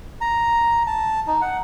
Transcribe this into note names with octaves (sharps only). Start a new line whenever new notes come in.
A#5
A5
D#4
F#5